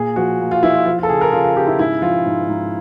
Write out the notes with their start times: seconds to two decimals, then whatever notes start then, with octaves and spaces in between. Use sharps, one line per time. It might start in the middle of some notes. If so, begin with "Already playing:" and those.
Already playing: A#2 G#4
0.16 F3 F#4
0.40 A#3
0.51 F4
0.63 F3 E4
0.74 F4
0.86 F3 F4
0.98 F4
1.03 A4
1.09 C#3 G#4
1.21 A#4
1.32 C#3 F4
1.44 F4
1.57 C#3 G4
1.67 E4
1.79 G#2 E4
2.02 F3 F4
2.26 G#2
2.49 G#2